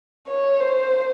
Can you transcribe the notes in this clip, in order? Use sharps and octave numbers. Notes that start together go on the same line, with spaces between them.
C#5
C5